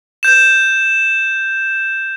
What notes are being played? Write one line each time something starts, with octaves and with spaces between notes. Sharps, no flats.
G6 E7